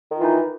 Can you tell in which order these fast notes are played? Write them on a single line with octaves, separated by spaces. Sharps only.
D#3 F4 E3 D#4